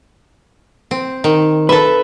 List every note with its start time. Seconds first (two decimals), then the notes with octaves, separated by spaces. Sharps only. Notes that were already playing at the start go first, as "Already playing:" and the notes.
0.91 C4
1.24 D#3
1.69 A4 B4 E5